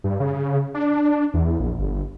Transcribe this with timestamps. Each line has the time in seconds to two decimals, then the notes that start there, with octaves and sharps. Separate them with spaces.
0.04 G2
0.20 C#3
0.74 D4
1.34 E2
1.60 A#1
1.78 G1